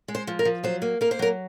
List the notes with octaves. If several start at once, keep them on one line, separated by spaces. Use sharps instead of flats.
G#3
C5
F3
A#4
F3
F#3 C5
A#3
A#3 A#4
C5
F#3 A#4